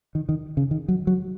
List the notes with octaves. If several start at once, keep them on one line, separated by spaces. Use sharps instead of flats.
D#3
D#3
C#3
D#3
F#3
F#3